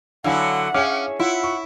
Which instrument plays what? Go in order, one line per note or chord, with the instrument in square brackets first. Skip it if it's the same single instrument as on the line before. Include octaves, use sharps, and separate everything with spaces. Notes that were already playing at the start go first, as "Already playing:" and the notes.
[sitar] D3 F#3 E4 [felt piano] F5 G#5 B5 [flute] F#5
[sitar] C#4 [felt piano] G#4 E5 G#5 [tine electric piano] F5 D6 F6
[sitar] E4 [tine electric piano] F4 [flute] F#5
[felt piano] C#6